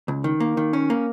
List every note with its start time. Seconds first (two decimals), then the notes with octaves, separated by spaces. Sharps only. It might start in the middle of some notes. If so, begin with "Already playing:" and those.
0.08 C#2
0.24 D#3
0.40 A#3
0.57 D#3
0.73 C#4
0.90 A#3